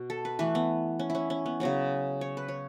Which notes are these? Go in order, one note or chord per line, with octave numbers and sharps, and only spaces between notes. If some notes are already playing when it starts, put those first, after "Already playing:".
Already playing: B2
A4
B4
E3 A3 B4
B3
C#4
E4
C#4
C#4
B3
C#3 F#3 B3 C#5
C#5
B4
C#5